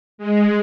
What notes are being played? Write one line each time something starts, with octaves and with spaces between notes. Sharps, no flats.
G#3